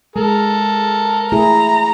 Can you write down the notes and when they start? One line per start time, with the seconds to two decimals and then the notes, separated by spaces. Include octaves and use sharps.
0.16 G#3 A4 A#4
1.32 A3 E4 G#4 A#5